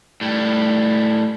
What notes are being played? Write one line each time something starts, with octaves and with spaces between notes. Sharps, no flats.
A2 G3